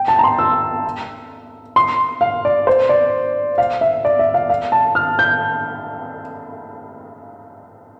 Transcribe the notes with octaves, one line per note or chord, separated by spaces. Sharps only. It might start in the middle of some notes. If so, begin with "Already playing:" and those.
Already playing: G5
A5
A#5
C6
E6
C6
F5
D5
C5
D5
F5
E5
D5
E5
F5
F5
A5
F6
G6